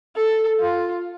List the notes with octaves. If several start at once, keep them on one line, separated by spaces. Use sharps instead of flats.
A4
F4